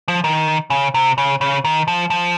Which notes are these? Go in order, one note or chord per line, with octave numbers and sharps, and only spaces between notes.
F3
D#3
C#3
C3
C#3
C#3
D#3
F3
F3